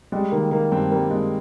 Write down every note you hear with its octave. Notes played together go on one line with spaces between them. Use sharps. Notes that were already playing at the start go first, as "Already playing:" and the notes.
G3 G#3
D#3 A#3
D#3 A#3
G2 C4
G3 A#3
G2 G#3